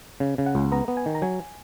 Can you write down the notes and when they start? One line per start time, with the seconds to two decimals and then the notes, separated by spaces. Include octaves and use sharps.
0.20 C#3
0.38 C#3
0.46 F#5
0.55 C#2
0.72 B3 A#5
0.88 B3
0.97 G#5
1.06 D#3
1.15 A#5
1.22 F#3 G#5